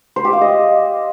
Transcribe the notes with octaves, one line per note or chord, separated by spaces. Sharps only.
C5
G4
F5
D#5